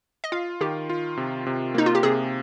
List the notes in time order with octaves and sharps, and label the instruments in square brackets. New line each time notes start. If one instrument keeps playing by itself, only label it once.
[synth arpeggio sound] D#5
[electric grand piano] F4 [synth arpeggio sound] F5
[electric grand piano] D#3 [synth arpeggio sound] G4
[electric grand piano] F4
C3
C3
[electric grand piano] A#3 [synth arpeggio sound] D#4
[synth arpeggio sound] F4
G4
[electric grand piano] C3 [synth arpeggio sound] G#4